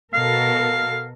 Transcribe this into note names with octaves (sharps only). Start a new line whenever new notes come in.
B2 A4 A#4 F5